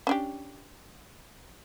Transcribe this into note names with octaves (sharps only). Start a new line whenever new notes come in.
C#4 D4 G4